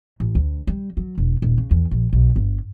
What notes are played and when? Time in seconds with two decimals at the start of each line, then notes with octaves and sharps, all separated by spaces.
0.20 A1
0.35 D2
0.67 G3
0.97 F#3
1.18 E1
1.42 D#1
1.58 C#3
1.71 E2
1.91 A#1
2.13 B1
2.36 G1